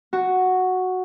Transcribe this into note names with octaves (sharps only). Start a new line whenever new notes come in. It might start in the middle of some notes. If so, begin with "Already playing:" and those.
F#4